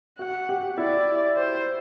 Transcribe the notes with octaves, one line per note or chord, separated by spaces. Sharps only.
F#4 F#5
G4
E4 D5
C5